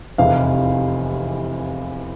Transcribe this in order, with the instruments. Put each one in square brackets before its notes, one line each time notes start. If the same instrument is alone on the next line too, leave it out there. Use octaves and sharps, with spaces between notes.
[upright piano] F1 E2 C3 F5